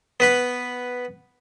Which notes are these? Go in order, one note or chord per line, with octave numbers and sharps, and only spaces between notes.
B3 B4 B5